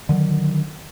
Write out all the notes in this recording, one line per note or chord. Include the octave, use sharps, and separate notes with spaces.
D3 D#3 F#3